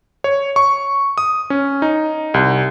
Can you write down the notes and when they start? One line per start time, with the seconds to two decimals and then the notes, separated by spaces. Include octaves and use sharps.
0.24 C#5
0.56 C#6
1.18 D#6
1.50 C#4
1.82 D#4
2.34 C2